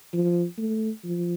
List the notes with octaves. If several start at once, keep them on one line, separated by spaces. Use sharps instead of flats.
F3
A3
F3